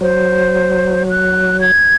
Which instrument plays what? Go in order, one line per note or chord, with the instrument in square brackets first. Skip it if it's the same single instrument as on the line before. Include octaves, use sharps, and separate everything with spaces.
[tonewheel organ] F#3 [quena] C5
[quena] F#6
G#6